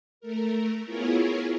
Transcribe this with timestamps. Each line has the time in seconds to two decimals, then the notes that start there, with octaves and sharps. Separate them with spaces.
0.20 A3 A#4
0.85 B3 E4 F4 G#4 A#4 C#5